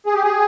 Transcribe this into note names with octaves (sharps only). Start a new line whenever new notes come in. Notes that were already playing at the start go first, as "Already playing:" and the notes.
G#4
G4
G#4